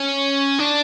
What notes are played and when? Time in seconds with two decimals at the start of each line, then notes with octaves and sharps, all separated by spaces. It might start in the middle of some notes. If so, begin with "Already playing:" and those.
Already playing: C#4
0.59 D4